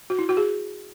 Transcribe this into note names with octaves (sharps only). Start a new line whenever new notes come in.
F#4
E4
F#4
G#4